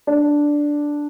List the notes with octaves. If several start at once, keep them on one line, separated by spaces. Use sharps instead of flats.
D4